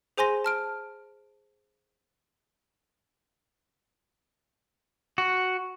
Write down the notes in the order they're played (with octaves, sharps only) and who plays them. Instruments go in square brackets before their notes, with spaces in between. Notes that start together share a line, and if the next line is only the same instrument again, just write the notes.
[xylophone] G#4 C5 G#5 C6 A#6
A5 F6 D7
[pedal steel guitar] F#4